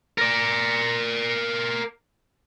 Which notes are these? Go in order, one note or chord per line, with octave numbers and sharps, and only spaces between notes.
A#4 D5